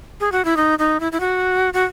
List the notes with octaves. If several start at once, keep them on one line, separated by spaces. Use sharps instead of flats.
G#4
F#4
E4
D#4
D#4
E4
E4
F#4
F#4